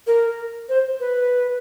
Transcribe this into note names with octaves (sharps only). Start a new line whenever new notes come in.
A#4
C5
B4